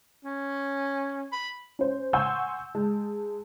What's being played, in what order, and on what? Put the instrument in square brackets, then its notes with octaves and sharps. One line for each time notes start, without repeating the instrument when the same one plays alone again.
[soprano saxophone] C#4
B5
[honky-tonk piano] C#4 C5
F#5 G#5 C6 C#6 E6 G6
G#3 A5